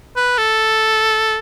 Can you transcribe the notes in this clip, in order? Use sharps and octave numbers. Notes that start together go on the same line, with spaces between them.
B4
A4